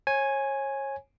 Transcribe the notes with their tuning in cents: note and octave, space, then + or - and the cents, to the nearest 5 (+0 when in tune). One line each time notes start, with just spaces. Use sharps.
C#5 -30 G#5 +0